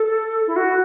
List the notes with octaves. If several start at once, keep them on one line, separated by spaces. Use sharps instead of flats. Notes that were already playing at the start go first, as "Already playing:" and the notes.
Already playing: A4
E4
F#4